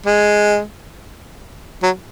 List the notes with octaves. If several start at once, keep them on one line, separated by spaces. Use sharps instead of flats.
G#3
F#3